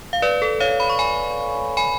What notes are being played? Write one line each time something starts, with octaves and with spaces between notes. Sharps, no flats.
F5
B4 D5
A4
C#5 F5
B5
C#6
G#5 B5
G#5 B5